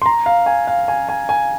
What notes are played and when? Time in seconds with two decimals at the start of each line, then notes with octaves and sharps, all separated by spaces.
0.02 C6
0.06 A#5
0.26 F5
0.46 G#5
0.67 F5
0.88 G#5
1.09 G#5
1.29 G#5